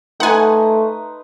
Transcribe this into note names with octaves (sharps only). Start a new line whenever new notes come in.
A3 D#4 B4 F#5 G#5 C6